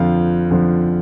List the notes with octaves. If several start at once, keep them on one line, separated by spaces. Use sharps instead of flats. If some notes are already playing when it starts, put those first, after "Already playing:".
Already playing: F2 D3 F3 F5
F2 D3 F3